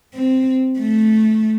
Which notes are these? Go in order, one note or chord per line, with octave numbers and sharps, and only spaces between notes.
C4
A3